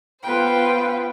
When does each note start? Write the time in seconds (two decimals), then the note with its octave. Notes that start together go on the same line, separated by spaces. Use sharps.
0.23 B3 F4 B4 C5 G5